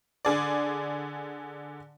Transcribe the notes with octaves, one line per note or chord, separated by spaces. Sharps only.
D3 G#4 D5